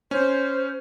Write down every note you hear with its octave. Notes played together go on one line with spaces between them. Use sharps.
C#4 C5